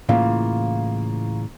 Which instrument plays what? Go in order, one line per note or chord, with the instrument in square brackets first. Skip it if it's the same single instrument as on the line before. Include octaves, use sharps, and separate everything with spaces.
[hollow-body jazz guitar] A2 C#3 E3 [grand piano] A#3 F4